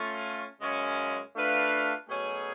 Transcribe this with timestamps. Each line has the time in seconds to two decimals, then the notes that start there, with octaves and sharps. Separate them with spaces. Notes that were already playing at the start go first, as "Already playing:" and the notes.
Already playing: A3 C#4 F4
0.60 F#2 C#3 G#3 C#4
1.34 A3 D4 F4 B4 F5
2.08 B2 F#3 A3 C#4 G#4